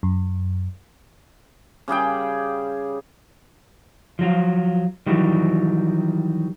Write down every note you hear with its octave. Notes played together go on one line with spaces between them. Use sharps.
F#2
C#3 G3 G#4 G5
F3 F#3 F4
D#3 E3 F#3 G3